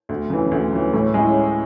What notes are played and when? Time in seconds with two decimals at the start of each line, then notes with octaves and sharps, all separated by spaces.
0.09 D2
0.30 C#3 E3
0.51 D2
0.73 C#3 E3
0.94 A2
1.14 G#3 C#4 E4 G#4